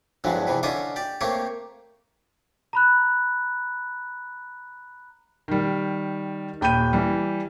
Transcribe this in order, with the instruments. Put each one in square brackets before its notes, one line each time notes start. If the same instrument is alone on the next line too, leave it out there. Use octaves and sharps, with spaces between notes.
[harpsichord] E2 G2 D3 F3 F#3 G#3
E2 C3 E3 F3
D3 C#4 F4 D#5 E5 D6
G4 D5
A3 A#3 C4 G4 C#5
[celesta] A#5 B5 F#6
[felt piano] D#3 G3
D#1 G5 B5 G6 D#7
E3 G3